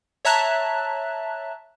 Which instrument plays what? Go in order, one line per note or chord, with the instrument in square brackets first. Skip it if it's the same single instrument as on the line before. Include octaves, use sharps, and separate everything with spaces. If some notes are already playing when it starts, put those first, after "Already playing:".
[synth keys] C#5 E5 A5 A#5 F#6